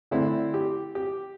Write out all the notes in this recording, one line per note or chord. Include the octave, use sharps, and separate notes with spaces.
D3 A3 C4 E4
G4
G4